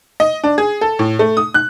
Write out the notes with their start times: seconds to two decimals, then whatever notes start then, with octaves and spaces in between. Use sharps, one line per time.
0.20 D#5
0.44 D4
0.58 G#4
0.81 A4
0.99 A2
1.19 A3
1.37 D#6
1.54 F#6